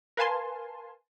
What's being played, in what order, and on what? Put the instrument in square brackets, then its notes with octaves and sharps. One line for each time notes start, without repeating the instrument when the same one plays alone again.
[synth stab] A#4 B4 F5 G#5 A5 C6